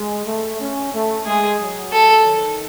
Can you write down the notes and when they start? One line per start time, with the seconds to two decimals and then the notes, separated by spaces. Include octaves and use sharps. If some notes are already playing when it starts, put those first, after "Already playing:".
Already playing: G#3
0.26 A3
0.60 C#4
0.93 A3
1.26 G#3 G#4
1.59 F#3
1.92 A4
2.24 D#3